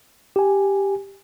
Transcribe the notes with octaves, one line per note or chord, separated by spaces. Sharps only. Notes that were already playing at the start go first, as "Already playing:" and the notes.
G4 G#5